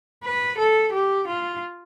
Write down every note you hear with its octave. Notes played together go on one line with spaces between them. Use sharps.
B4
A4
G4
F4